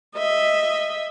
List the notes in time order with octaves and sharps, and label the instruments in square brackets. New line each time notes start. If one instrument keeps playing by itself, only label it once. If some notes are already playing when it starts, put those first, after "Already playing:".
[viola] D#5 E5